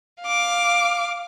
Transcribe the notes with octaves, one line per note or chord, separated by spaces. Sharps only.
F5 D6